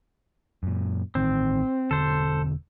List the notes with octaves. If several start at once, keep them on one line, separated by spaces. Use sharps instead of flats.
F#2 A#2
A1 D#3 C4
E1 D3 C4 A4 C5